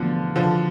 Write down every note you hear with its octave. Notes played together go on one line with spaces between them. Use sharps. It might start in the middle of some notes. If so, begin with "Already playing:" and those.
Already playing: E2 B2 D3 F3 A3 D4
D3 F3